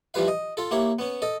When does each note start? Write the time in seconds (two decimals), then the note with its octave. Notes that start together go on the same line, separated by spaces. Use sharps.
0.14 E3 F3 G3 B4 F5
0.28 D#5
0.57 F4 A4
0.71 A#3 E4 G4 C#5
0.99 B3 C#4
1.22 A4 D#5